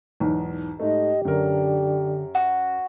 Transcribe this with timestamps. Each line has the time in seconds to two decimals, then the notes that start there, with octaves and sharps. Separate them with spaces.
0.20 B1 E2 G#2
0.80 G#2 A3 G4 D#5
1.25 F#2 D3 A#4
2.35 F#4